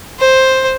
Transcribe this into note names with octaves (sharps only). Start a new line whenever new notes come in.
C5